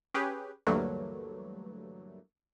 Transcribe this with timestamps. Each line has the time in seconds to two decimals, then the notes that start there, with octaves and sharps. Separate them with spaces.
0.14 C#4 G4 G#4 B4
0.67 D2 G2 E3 F#3 A3 A#3